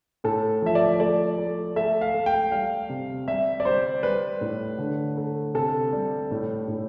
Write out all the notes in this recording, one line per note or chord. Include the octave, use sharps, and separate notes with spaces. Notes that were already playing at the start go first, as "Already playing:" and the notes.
A2 A4
F3 E5
D5
A3 D5
A3
A3 E5
F5
A3
G5
G3 F5
C3
G3 E5
D5
G3 C5
G3 B4
A2
D3
A3
C3 A4
G3
A2
A2